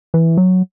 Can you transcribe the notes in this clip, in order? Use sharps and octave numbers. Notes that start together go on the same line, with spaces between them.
E3
F#3